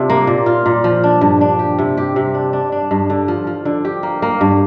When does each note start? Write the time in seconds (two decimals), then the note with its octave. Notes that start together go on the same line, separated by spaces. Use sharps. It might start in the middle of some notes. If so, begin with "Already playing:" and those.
Already playing: C3 D4 F4
0.10 A#3
0.27 A#2
0.46 F4
0.66 A#2
0.84 F3
1.03 D4
1.21 G2
1.41 D4
1.59 G4
1.79 C3
1.97 G4
2.16 C3
2.35 D4
2.53 D4
2.72 D4
2.91 G2
3.10 D3
3.28 F3
3.47 F3
3.65 D3
3.85 G4
4.03 A#3
4.22 A#3
4.41 G2